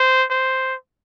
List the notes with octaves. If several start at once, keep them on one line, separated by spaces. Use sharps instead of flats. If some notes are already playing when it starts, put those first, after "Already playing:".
Already playing: C5
C5